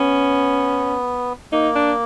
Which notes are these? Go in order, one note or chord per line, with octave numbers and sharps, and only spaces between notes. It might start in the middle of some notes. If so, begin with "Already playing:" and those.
Already playing: B3 C#4
A#3 D#4
D4